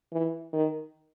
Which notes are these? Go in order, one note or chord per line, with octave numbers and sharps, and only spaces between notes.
E3
D#3